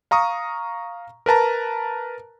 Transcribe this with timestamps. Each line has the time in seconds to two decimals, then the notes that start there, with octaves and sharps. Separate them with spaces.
0.11 F5 A#5 C#6 D#6
1.26 A#4 B4 A5 A#5